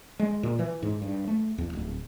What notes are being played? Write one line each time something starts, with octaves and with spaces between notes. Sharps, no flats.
G#3
A#2
E3
G#2
G2
A3
E2
D1